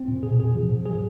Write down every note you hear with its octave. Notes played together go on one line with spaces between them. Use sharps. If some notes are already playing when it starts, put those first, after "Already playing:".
Already playing: C4
A#2
B2 G#4
B2 G#4
F3
G#2
F#3 G#4